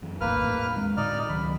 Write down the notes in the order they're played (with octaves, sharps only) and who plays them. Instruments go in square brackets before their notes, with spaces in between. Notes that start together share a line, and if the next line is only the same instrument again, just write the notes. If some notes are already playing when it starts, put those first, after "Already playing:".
[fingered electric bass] F#2 E3
[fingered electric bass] G#1 D#2 A2 [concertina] A#3 B4 F6
[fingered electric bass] E2 A2 A3
G#3 C4 D4
[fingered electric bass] A2 D3 [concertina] D#4 D5 F6
[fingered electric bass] C#2 D#3 F#3 [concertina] B5